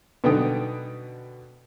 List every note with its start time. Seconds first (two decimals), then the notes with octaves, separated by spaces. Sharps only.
0.24 B2 D3 B3 D#4 G5 D#6